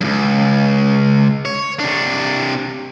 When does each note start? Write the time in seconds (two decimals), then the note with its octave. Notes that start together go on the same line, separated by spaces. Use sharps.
0.01 C#2 F#2
1.45 C#5
1.79 C3 D4